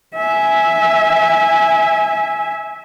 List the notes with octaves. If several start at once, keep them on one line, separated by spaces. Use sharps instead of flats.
E5 G#5